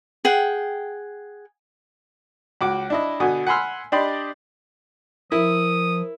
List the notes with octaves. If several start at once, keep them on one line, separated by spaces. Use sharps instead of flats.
G#4 F#5 G5
C#2 F#4 D6
D4 E4 D#5
B2 D3 G#5 D#6
F#5 G#5 B5 C6 E6 F6
D4 G4 D5 D#5 B5 C6
F3 E4 A#4 D#6